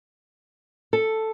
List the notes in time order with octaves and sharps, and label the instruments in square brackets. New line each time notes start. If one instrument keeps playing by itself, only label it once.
[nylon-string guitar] A4